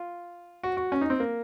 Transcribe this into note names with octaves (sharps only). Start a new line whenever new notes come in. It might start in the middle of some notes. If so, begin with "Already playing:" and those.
Already playing: F4
F#4
F#4
C#4
D#4
C4
A#3